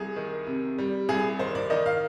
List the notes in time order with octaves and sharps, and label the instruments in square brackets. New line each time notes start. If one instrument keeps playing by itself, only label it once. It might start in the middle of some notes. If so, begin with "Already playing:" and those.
Already playing: [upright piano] C2 G#4
D#3
C3
G3
C2 G#4
D#3 C5
D5
D#3 D#5
F5